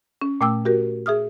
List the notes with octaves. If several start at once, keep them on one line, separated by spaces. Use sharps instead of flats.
C#4
A#2 A3 G5 D6 E6
F#4 G4 A#4
G#4 E5 D#6 F6